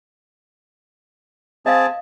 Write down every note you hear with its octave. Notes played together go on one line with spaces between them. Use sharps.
C4 G#4 D#5 F5 A5